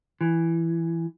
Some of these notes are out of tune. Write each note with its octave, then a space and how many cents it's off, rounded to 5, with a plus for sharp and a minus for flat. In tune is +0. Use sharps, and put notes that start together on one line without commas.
E3 +10